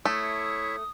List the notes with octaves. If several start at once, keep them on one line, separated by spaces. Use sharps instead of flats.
A3 E4 C#5 E5 D#6